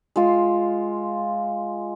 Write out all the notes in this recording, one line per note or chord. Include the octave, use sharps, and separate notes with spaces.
G#3 F4